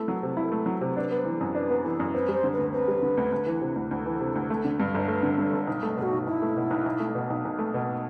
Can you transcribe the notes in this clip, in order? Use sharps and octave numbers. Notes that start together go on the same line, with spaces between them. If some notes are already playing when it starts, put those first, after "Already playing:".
Already playing: A3 E4 A4
F#3
C3
E4
A3
F#3
C3
D4 B4
B3 C5
E3
A4
F#2
D4 B4 C5
B3
E3 A4
F#2
C4 B4
G3
C5
D3
B4
D2
C4 B4
G3
D3
D2
D2
E3
C3
D2
D2 A4
E3
C3
D2
A3
D3
G2
G1
A3 B4
D3
G2 A4
G1
B1
A3
B2 A4
F#4
B1
B1 E4
A3
B2
B1
B1
A3
B2
B1
B1
A3
B2